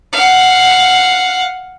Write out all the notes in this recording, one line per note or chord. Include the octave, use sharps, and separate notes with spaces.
F5 F#5